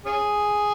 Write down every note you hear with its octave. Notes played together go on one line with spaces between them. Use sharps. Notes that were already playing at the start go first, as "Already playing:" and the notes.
C#4 G#4